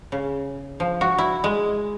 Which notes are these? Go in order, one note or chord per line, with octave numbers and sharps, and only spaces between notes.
C#3
F3
F#4
E4
G#3